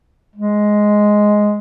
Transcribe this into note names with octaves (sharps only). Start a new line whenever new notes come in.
G#3